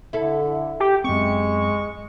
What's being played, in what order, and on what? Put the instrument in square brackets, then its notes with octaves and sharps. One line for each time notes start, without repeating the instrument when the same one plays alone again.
[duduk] D3 [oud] E4 A4
[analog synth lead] G4
[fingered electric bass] F#2 B3 C4 [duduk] G#3 [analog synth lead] C#6